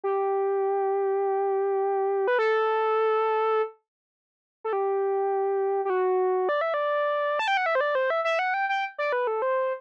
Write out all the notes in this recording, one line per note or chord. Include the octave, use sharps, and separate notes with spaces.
G4
B4
A4
A4
G4
G4
F#4
D5
E5
D5
A5
G5
F#5
E5
C5
D5
C5
E5
E5
F#5
G5
G5
D5
B4
A4
C5